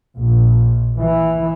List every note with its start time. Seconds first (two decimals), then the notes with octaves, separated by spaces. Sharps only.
0.17 A#1
0.99 E3